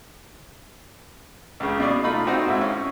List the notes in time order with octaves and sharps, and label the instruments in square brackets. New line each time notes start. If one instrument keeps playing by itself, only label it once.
[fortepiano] C#2 C#3
B2 D5
A3 D#4 F4 B5
C4 D#4 F#4
G#2 E4
C#4